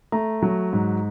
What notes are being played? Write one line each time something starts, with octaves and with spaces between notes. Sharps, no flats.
A3 A#5
F#3
G#2